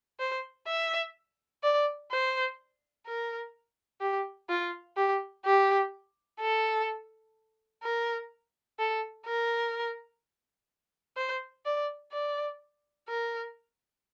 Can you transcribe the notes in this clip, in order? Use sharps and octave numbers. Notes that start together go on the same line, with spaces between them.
C5
E5
D5
C5
A#4
G4
F4
G4
G4
A4
A#4
A4
A#4
C5
D5
D5
A#4